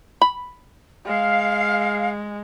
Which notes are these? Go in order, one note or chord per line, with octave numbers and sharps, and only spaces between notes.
B5
G#3 F5